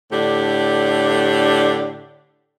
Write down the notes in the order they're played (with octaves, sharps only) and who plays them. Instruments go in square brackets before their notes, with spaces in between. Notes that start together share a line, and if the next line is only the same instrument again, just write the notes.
[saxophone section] A2 D3 D4 G4